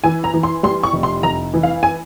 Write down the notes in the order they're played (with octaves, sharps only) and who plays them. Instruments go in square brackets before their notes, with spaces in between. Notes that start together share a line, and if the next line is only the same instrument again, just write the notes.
[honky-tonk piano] E3 G#5
A#5
E3
C6
G3 C6
C#6
F1
C6
F1 A#5
E3
F5
G#5